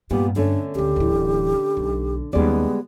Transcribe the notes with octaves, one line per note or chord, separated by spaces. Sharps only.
G2 A#2 B3 G4
D3 A3 C#4 D4
D2 C#3 G4
D1 E3
B1
D#2 C#3 G3 G#3 B3 D5